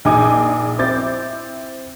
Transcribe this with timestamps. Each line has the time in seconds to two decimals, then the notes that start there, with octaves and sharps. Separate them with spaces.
0.05 A#1 D#4 G#4 G#5 D6 D#6
0.79 C4 E4 D6 G6 A6